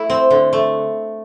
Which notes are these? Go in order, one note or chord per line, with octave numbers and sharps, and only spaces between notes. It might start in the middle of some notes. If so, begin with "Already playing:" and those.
Already playing: A3 E4
C4
D3
A3